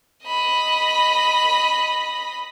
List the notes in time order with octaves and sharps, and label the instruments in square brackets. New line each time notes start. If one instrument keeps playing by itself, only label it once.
[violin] D#5 B5